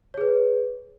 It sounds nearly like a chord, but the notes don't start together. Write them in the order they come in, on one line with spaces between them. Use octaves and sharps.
C#5 G#4 B4